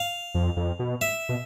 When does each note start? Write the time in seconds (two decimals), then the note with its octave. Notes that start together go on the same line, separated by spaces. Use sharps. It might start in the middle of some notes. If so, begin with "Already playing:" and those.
Already playing: F5
0.34 F2
0.57 F2
0.79 B2
1.01 E5
1.29 B2